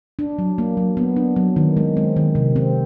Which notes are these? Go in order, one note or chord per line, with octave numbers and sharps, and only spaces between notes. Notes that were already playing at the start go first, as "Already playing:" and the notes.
D4
F#3
A#3
F#3
B3
D4
F#3
D#3
G#3
C4
D#3
C3
C4